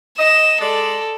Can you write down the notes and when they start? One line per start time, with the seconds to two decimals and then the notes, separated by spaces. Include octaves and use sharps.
0.18 D#5 E7
0.61 G#3 A4 D5